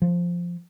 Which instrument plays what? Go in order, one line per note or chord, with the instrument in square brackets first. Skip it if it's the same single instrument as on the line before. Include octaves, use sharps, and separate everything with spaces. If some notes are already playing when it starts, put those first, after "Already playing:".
[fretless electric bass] F3